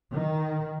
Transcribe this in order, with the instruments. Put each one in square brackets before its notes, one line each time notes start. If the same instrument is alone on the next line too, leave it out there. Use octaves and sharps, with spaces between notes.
[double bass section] D#3